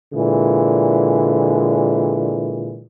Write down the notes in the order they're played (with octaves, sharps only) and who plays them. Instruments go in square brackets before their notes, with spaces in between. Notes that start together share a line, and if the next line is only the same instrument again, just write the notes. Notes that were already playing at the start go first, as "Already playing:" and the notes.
[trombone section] A#2 D3 E3 G#3